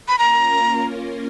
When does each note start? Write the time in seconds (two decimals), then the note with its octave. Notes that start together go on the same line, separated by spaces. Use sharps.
0.08 B5
0.18 A#3 C#4 F4 A#4 A#5